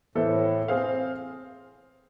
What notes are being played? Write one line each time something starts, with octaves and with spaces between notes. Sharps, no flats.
A2 E3 B3 E4 A4 C5
C4 G#4 C5 F5